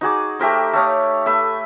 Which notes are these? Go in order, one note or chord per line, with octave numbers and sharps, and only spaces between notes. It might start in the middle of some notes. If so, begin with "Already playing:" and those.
D#4 F#4 G#4 D6
A3 G4 A#4 C5
A3 C#5 F5 D#6
A3 B4 E5